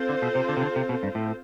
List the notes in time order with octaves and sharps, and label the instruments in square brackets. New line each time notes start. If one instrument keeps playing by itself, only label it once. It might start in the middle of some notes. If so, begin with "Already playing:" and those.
Already playing: [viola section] C4 F4 A4 C5
[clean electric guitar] D3
B2
C3
D3
C3
D3
C3
B2
G2
A2